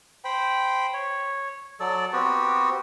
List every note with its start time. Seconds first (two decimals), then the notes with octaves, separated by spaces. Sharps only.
0.24 C5 G5 B5
0.93 C#5
1.80 F#3 A4 D5
2.13 B3 C4 F#4 G4